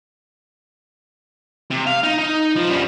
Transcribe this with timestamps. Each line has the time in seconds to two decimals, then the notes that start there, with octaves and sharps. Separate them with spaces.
1.70 C3
1.86 F5
2.03 D#4
2.19 D#4
2.56 F3
2.69 F#2 G3